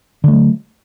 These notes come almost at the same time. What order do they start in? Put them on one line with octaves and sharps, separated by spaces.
D3 A3 F#3